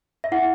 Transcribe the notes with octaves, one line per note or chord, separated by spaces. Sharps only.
E5
E4 F#5